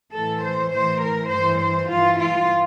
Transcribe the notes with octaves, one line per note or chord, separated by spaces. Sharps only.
A2 E3 A4
C5
A2 E3 C5
A#4
G2 E3 C5
C5
G2 E3 F4
F4